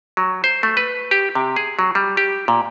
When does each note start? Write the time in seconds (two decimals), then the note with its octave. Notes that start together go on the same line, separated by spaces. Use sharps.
0.17 F#3
0.44 C5
0.63 A3
0.77 B4
1.11 G4
1.35 C3
1.56 G#4
1.79 F#3
1.95 G3
2.17 G4
2.48 A#2